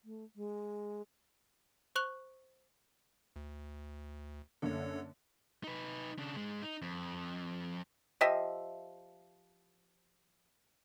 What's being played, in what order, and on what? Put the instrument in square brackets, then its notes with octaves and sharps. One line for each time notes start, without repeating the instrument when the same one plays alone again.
[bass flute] A3
G#3
[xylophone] C5 C#6 F#6 F7 F#7
[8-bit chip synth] D2
[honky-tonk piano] F#2 D3 A#3 [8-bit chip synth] A4 C#5
[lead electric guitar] D#4 B4
C#3 D4
G#2 G#3
D#4
F2
[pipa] F3 G4 D#5 E5